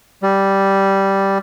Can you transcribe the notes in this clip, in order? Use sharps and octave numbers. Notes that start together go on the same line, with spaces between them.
G3